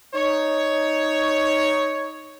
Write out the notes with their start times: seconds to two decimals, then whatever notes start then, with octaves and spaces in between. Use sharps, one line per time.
0.15 D#4 C#5